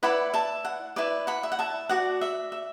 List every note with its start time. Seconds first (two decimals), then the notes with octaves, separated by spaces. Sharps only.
0.03 E4 B4 D5 F#5 B5
0.34 E5 A5
0.65 F#5
0.96 E4 B4 D5
1.27 F#5 B5
1.43 E5
1.52 F#5
1.59 E5 A5
1.89 F#4 D5 F#5
2.21 E5
2.52 E5